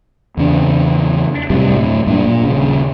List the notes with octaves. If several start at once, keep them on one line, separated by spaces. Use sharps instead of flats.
E2 C#3 D4
F#2 A2 C3 G3
D1 A2
G2 A#2 D4
A#2
D#1 C#3